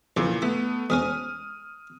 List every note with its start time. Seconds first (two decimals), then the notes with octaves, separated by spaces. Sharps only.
0.17 F2 A#2 C#3 E3
0.42 A3 B3 E4
0.90 E2 G#2 C#4 D#6 F6